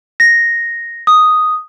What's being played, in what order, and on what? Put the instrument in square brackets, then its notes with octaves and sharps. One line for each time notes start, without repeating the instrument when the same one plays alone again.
[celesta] A#6
D#6